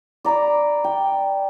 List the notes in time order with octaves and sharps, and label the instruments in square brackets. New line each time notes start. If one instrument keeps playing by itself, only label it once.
[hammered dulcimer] D5 A#5 B5 D6
G5